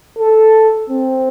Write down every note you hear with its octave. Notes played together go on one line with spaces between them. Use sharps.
A4
C4